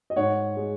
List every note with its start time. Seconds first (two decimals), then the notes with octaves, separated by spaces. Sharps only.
0.10 D#5
0.16 G#2 C#5 F#5
0.57 G#3